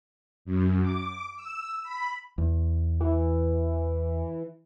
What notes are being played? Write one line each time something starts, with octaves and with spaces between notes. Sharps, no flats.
F#2
D6
E6
B5
E2
E3